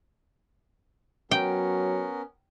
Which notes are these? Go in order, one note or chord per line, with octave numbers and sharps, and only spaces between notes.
F#3 B3 C#4 A#4 G5